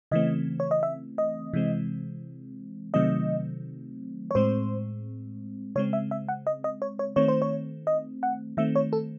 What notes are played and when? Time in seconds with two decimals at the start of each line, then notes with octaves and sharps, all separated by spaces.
0.11 C#3 E3 A3 C4 D#5
0.60 C#5
0.71 D#5
0.83 E5
1.18 D#5
1.53 C3 E3 G#3 C4
2.94 C3 D#3 F#3 A3 C4 D#5
4.31 C#5
4.35 A2 G#3 C4 C5
5.76 C#3 G#3 C4 C#5
5.93 E5
6.11 E5
6.29 F#5
6.47 D#5
6.64 D#5
6.82 C#5
6.99 C#5
7.16 D#3 A3 C4 C#5
7.28 C5
7.42 C#5
7.87 D#5
8.23 F#5
8.57 D#3 A3 C4 E5
8.75 C#5
8.93 A4